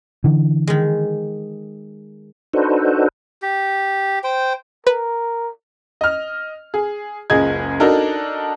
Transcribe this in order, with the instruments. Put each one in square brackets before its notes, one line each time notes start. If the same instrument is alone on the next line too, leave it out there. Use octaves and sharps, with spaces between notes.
[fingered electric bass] D3 E3
[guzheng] D#3 G#3
[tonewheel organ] D4 D#4 F#4 A4 B4 C5
[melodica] G4
C5 G5
[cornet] A#4 [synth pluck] B4
[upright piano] D#5 F6
G#4
F#1 C#2 G#4 D#5 G#6
D4 D#4 F#4 A4 A#4